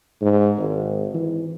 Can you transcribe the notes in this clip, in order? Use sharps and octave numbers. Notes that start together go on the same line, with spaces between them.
G#2
G#1
E3